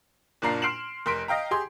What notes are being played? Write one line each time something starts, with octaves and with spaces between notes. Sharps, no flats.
F#1 A#2 D4 F4 A#5 C7
C6 F6 C7 D7 E7 F#7
F1 A#4 C6 B6 D7
D#5 F5 G5 A#5
G4 G#4 C6